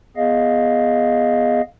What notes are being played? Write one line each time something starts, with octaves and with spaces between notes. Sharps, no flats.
B3 G#4 D#5 F5